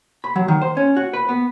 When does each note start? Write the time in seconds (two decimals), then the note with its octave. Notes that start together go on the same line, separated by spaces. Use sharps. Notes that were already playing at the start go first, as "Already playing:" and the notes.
0.24 B5
0.36 F#3
0.48 D#3
0.62 C5
0.77 C#4
0.97 F#4
1.13 B4
1.29 B3